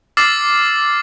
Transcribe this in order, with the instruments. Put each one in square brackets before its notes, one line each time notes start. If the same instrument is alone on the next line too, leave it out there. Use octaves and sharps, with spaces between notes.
[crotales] D6 E6 F6 A6 C7